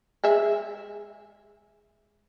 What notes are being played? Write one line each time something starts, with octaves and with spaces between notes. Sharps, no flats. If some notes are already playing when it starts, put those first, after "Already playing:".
G#3 G#4 E5